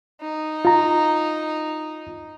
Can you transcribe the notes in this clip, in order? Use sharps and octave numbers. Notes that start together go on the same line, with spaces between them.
D#4
F4 A#5